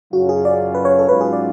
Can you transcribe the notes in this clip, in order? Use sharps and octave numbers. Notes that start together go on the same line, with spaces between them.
F#2 C#3 F#3 C#4 F4 F#4
G#4
D5
B4
C#5
A4
G#2 F#3 C#4 F4 B4
G#4
D5